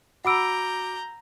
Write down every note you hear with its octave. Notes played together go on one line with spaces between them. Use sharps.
F#4 F#5 A#5 B5 D6 E6 G6 D7